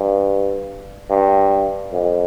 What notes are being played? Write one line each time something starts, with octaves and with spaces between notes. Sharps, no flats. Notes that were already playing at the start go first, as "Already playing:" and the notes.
Already playing: G2
G2
F2